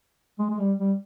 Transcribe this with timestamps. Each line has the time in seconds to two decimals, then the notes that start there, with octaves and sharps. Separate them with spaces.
0.39 G#3
0.50 G#3
0.59 G3
0.78 G3